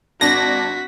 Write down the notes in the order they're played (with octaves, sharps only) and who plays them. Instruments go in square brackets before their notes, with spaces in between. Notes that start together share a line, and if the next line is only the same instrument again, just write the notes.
[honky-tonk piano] G#1 D4 [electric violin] F#4 B6 [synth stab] A#6